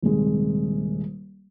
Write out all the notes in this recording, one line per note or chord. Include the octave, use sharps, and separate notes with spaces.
D#1 C3 G#3